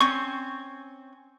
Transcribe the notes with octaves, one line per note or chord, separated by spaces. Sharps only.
C4 C#4 C#6